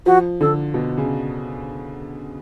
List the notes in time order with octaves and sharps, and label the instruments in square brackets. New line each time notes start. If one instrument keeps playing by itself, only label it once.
[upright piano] F3 [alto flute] F#4
[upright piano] D3 [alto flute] A4
[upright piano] B2
C#3